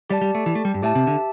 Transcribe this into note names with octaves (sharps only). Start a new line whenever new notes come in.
G3 G4 D5 A5
G3
A3
E3
A3
G3
G2
A2 G4 E5 A5
C3
D3